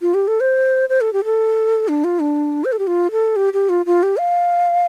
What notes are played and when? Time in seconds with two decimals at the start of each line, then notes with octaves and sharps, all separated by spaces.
0.02 F4
0.14 G4
0.28 A4
0.40 C5
0.89 C5
1.01 A4
1.13 G4
1.25 A4
1.88 D4
2.04 F4
2.21 D4
2.65 C5
2.72 A4
2.79 G4
2.87 F4
3.11 A4
3.36 G4
3.53 G4
3.69 F4
3.86 F4
4.03 G4
4.19 F5